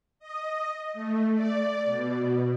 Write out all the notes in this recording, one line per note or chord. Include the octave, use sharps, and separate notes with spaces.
D#5
A3
D5
B2